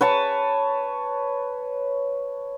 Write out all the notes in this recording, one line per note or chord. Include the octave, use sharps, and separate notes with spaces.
B4 C#5 A5